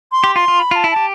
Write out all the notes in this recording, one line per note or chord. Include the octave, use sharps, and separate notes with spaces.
C6
G4
F4 C6
F4
B5
F4 A5
E4
G4 A5